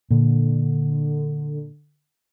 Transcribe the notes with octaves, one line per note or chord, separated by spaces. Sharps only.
A#2 D3